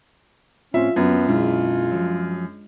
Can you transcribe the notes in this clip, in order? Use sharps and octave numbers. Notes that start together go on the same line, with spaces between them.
A2 C4 C#4 F4 C5 E5
F#2 F#3 B3 C4
B2 G#3 D4 E4 F4
F3 F#3